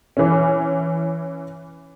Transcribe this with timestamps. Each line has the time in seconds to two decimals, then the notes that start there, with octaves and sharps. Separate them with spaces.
0.17 E3 C#4